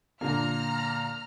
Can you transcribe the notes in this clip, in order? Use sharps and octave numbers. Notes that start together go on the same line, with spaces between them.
A#2 D3 A#3 A#5 F6